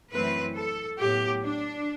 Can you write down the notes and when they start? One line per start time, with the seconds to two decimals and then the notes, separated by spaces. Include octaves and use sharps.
0.11 F#2 E3 A3 C4 B4
0.55 A4
0.98 A2 F#3 B3 G4
1.42 D4